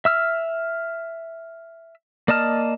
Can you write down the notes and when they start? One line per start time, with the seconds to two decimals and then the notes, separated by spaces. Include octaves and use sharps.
0.05 E5 E6 F6
2.28 A#3 D5 D#5 A5 F6